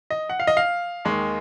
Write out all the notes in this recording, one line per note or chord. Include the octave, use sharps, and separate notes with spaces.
D#5
F#5
F5
D#5
F5
D#2 D#3 G#3